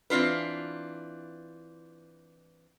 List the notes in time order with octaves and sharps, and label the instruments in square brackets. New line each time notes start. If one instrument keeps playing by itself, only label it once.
[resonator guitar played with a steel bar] E3 C4 D4 F4 B4